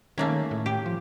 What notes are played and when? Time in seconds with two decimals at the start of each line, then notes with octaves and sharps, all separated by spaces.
0.18 D#3 A3 A#3 C#4
0.51 A2
0.66 G4
0.86 F3